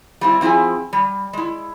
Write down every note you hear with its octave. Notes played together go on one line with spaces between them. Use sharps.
G3 C4 E4
F3 C4 E4 G#4 G#5
G3
G#3 E4